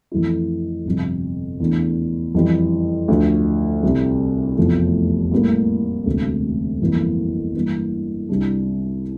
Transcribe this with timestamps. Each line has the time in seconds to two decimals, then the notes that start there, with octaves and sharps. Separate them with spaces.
0.12 F2 E3 A3 E4
0.85 G1 F2 C3
1.60 E2 E3 A3 D4
2.34 F2 E3 G3
3.08 D2 D3 F3
3.83 C2 C3 G3
4.57 F1 E2 C3 F3 A3
5.32 A2 G3 A#3
6.06 E1 D2 C3
6.81 G1 F2 E3 A#3
7.55 G2 E3 A#3
8.29 C2 C3 G3 D4